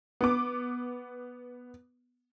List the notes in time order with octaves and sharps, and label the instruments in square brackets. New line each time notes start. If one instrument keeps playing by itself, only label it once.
[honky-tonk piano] B3 D6